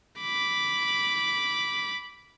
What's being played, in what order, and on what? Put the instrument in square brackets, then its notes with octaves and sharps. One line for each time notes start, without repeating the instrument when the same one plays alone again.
[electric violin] B5 D6